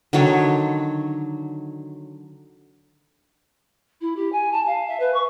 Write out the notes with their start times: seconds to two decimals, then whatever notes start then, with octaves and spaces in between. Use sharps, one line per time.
0.13 D3 D#3 F#3 C#5
4.01 E4
4.15 G4
4.32 G#5
4.52 A5
4.66 F5
4.87 E5
4.99 B4
5.13 C#6